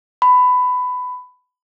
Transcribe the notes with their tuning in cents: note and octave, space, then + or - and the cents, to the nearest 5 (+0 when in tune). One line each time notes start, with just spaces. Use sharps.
B5 +15